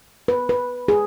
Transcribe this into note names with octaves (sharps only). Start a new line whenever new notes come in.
B4
B4
G#4